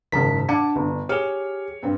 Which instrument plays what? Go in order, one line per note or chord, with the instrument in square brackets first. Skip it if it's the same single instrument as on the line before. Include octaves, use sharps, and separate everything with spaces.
[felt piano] F#1 G#2 A5 [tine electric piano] D#3 B6
[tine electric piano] D4 [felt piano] F#5 A5 D6
[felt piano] G1
[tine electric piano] G4 G#4 [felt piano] C#5 F6
[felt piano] G2 C4